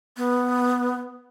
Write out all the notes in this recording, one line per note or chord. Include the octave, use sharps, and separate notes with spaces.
B3